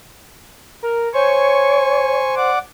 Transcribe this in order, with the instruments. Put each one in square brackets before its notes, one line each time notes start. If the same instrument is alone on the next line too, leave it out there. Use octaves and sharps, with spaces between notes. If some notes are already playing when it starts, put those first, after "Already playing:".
[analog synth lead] A#4
[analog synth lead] C5 [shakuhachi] C#5 [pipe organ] G#5 C#6
[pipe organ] D5 F#5 D6